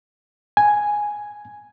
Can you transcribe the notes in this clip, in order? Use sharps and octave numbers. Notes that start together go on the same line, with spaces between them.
G#5